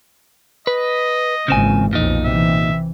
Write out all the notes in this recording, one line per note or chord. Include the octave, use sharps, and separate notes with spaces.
B4 D#5
G#1 A#2 C#3 E3 C4 G#5
B1 F2 A#2 D#4
C3 E3 E5